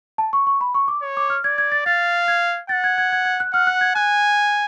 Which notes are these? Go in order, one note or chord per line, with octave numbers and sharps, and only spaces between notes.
A5
C#6
C#6
B5
C#6
D6
C#5
D6
F6
D5 G#6
G#6
A6
F5 A6
G#6
F#5 A6
G#6
G#6
G#6
G#6
F#6
F#5 F6
F#6
G#6
G#5 F#6